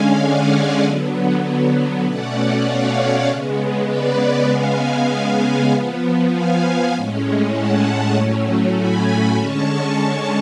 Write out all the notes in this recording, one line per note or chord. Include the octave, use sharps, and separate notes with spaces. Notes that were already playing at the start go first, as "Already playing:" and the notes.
Already playing: D3 G#3 C#4 F5 G#5
D5 F#5
D3 F#3 B3
B2 A3 C#4 D5 F#5
C#5 F5
C#3 G#3 B3
B4 D5
C#3 G#3 B3 F5 G#5
F3 B3
F5 G#5
A2 G#3 C#4
F#5 A5
A2 F#3 A3 C#4
G#5 B5
D3 G#3 C#4 A5 C#6